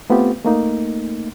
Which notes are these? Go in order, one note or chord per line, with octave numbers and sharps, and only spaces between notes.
A3 B3 C4 F4 G4
A3 A#3 D#4